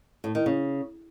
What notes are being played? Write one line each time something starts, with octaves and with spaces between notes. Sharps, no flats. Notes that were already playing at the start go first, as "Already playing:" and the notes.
A2
D#3
C#3